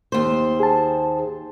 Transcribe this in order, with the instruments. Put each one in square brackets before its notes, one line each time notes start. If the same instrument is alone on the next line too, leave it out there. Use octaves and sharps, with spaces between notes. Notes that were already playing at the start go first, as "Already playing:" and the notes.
[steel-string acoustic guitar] D#2 C5
[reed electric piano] G#4 A5